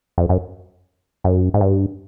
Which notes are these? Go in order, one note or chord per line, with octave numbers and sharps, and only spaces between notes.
F2
F#2
F#2
G#2
G2